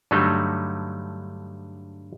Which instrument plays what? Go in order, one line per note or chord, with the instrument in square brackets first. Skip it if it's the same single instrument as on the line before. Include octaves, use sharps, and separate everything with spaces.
[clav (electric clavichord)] G2 D3 F#3 G3 A3 D#4